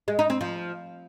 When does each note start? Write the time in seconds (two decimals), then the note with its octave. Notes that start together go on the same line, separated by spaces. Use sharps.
0.08 G#3
0.19 D#4
0.30 C4
0.41 F3